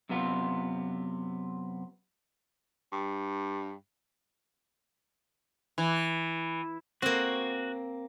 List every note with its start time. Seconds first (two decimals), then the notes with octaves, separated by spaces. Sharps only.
0.09 F#2 C3 B3 F4
2.92 G2
5.78 E3
7.02 A#3 C4 F#4